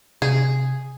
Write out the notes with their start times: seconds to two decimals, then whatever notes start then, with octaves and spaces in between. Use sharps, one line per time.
0.22 C3 G#4